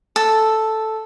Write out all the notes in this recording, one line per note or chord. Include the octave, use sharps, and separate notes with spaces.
A4